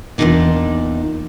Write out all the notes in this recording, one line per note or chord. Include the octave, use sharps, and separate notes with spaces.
E2 A#2 G3 D4 D#4 D5